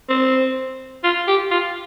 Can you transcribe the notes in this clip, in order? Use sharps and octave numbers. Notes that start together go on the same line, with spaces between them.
C4
F4
G4
F4